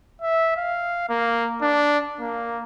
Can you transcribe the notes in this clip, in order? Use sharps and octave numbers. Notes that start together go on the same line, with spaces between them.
E5
F5
A#3
D4
A#3